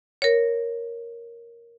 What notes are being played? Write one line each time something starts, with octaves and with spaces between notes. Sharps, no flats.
A#4 C#5